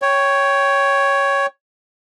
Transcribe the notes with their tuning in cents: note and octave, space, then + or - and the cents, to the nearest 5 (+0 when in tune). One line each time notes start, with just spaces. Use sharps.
C#5 +5 G5 +0